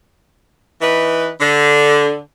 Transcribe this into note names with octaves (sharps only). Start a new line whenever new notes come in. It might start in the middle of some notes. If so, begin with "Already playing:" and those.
E3 D#4 B4
D3